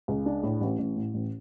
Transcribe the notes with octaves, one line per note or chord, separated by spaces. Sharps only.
C#2
D4
A2
A1
A1
A2
A1